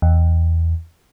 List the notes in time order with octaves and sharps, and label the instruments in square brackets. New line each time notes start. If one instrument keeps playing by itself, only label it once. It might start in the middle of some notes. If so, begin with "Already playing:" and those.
[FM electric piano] E2